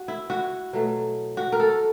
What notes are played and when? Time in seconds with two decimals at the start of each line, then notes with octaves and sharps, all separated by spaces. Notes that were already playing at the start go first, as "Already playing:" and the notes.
Already playing: F#4
0.08 E4
0.30 F#4
0.73 B2 F#3 A3
1.37 F#4
1.52 A#4
1.60 A4